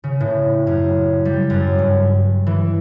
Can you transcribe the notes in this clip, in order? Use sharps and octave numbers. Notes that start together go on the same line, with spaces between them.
C#3
A2
F#2
G3
F#2
G2
E3